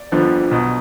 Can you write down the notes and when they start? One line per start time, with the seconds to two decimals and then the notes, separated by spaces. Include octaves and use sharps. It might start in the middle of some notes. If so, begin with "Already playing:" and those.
Already playing: D5
0.12 G1 F2 D3 F3
0.51 B1 B2